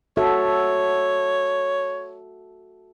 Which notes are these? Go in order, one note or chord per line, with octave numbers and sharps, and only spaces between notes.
F#4 A4 C#5 E5